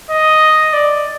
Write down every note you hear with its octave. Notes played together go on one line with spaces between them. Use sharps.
D#5
D5